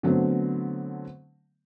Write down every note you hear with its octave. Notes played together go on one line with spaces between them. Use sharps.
D3 F#3 A3 B3 C4